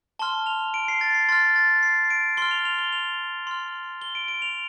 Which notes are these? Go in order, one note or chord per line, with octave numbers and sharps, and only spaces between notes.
A5 C6 F6 G7
F7
D7
C7
A6
C7
C6 F6 A6
A6
C7
D7
C6 F6 G7
F7
F7
G7
F7
C6 F6
G7
D7
D7
F7